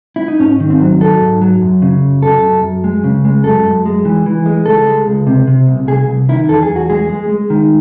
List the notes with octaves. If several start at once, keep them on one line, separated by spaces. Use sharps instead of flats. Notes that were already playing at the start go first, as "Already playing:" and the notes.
E4
D#4
G#2 C#4
D#3
C4
F#3
F#3 A4
G#2
F#3
F#2
C#3
F#2
F#2 A4
F#2
F#2
G#3
C#3
G#3
F#2 A4
F#2
G#3
E3
E3
G#3
C#2 A4
G#3
C#2
C3
C3
C2
C2 G#4
C2
D#3 E4
E2 A4
G#4
E2
F#4
G#3 G#4
G#3
G#3
D#3